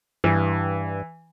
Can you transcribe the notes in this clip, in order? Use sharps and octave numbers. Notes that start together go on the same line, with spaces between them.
G2 E3